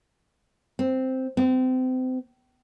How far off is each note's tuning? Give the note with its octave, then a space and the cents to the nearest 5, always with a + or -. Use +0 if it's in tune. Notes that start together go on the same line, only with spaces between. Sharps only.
C4 -5
C4 -30